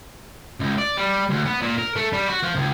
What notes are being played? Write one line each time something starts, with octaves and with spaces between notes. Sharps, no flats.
C#2
D5
G3
D2
B3
A#2
A#4
A3
G3
F#4
F3
C#2